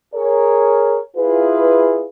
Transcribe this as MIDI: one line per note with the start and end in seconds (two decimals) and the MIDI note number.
0.14 1.00 68
0.14 1.00 70
0.14 1.00 73
1.17 2.06 64
1.17 2.06 65
1.17 2.06 68
1.17 2.06 71